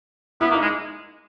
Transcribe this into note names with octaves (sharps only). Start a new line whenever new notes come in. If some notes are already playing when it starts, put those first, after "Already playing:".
B3 E4
A#3
D#4
G#3